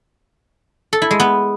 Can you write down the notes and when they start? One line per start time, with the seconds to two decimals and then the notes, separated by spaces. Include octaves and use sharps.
0.93 A4
1.02 E4
1.11 G#3
1.20 B3